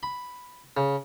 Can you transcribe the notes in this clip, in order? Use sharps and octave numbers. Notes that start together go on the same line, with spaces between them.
B5
C#3